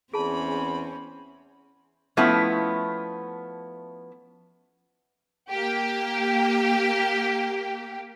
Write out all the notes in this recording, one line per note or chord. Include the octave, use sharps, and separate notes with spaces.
E2 C4 C#4 G#4 A5 B5
F3 A3 B3 C#4 E4
A#3 G4